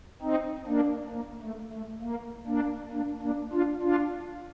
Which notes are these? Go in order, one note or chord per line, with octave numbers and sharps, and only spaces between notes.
C4 D#4
A#3 D4
A#3
A3
A3
A#3
A#3 D4
A#3 D4
A#3 D4
D4 F4
D4 F4